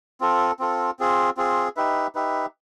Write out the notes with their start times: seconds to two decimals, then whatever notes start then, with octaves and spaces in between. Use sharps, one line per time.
0.21 C4 F4 A4
0.59 C4 F4 A4
0.99 C4 F4 G#4
1.37 C4 F4 G#4
1.76 D#4 G4 B4 E5
2.15 D#4 G4 B4 E5